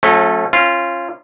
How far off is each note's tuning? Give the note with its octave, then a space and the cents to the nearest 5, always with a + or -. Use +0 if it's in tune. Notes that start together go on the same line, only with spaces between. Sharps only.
F3 +45 A3 -10 C#4 -35
C#4 -30 F4 -15